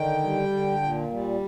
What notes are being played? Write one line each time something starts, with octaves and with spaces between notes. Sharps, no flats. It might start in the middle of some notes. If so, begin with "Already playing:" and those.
Already playing: D3 D#3 G5
G3
D3
A#2
G3